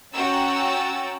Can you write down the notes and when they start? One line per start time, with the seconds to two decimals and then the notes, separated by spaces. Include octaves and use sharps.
0.14 C#4 F#4 G5 A#5 E6 A6